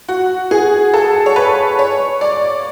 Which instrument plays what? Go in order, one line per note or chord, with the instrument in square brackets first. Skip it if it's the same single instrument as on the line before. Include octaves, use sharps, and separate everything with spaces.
[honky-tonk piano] F#4
G#4
A4
C#5
B4
C#5
D5